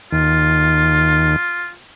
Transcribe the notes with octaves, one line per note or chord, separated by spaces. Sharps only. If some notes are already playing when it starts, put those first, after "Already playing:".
D#2 F4